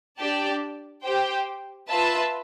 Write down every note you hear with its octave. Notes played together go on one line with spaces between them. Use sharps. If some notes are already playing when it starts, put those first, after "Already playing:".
D4 G4 D5 A5
G4 C5 G5
F4 B4 E5 A5